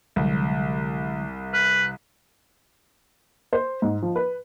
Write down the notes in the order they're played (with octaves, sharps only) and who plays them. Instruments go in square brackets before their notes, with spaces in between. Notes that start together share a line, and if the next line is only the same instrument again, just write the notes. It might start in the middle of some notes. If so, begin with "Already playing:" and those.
[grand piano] C2 [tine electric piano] D3 F#3 G#3
[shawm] B4 [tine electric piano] F6
[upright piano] C5
G#2
F3
B4